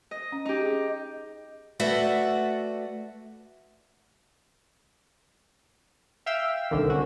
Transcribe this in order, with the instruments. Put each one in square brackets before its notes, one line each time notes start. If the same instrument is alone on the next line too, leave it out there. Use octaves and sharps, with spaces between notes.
[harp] D#5
[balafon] C#4
[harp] D#4 G4 [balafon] D#5
[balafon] G#4
[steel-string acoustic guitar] A3 F#4 B4 D5 E5 F#5
[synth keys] E5 F5 G5 E6
C2 D3 D#3
C#4 F#4